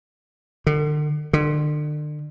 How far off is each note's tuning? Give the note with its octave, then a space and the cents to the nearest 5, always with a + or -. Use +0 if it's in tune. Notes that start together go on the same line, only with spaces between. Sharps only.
D3 +40
D3 +35